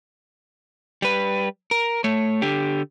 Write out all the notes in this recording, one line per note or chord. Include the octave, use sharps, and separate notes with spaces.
G3 B4
A#4
A3 C#5
D3 G4